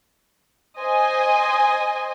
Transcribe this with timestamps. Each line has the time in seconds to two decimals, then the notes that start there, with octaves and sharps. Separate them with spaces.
0.81 C5 D#5 G#5